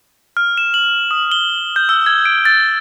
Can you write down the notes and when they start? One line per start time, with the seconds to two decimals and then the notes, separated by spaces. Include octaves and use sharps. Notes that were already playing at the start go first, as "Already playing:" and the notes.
0.37 F6
0.58 E7
0.74 F#7
1.11 D#6
1.32 G7
1.76 G6
1.89 E6
2.06 G#6
2.25 D7
2.45 A6